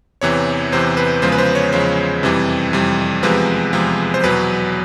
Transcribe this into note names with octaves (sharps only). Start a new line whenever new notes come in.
E2 C3 E3 C#5
E2 C3 E3 C5
B4
E2 C#3 F3 G#3 C5
B4
C5
C#5
E2 C#3 F3 G#3 C5
F2 C3 E3 G3
F2 C3 E3 G3
E2 C3 F3 G#3 B4
E2 C3 F3 G#3
C5
E2 B2 F#3 B4